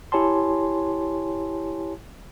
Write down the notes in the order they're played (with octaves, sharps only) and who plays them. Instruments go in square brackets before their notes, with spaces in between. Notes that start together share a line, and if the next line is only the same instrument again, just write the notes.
[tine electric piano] E4 G4 C#5 G#5 A5 C6